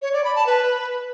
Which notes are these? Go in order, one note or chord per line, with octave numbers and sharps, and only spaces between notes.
C#5
D5
B5
A5
B4